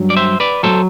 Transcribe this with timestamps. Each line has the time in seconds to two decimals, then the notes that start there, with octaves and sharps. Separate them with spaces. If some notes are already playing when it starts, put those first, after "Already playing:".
Already playing: G2 F#3
0.10 D5
0.17 C5 E5
0.40 B4 D5
0.63 A2 F#3 A4 C5